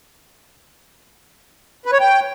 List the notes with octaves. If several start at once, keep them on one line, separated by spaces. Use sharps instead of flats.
B4
C#5
G5